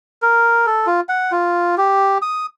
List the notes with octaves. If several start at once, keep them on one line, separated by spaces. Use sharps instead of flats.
A#4
A4
F4
F#5
F4
G4
D#6